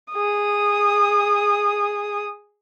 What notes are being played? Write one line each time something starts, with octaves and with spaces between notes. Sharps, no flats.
G#4 D#6